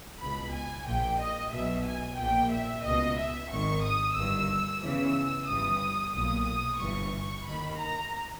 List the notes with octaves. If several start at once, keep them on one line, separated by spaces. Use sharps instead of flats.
C#2 B2 B5
G#5
A#1 A#2 G5
D#5
B1 B2 E5
G#5
A#1 A#2 G5
E5
C#2 B2 D#5
E5
G#1 G#2 D#3 C#6
D#6
G1 G2 D#3 E6
E2 C#3 E3 E6
G1 G2 E3 D#6
B1 A#2 D#6
D#6
G1 G2 E3 C#6
D#2 D#3 B5
A#5